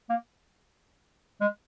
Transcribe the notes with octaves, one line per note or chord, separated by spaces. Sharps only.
A#3
G#3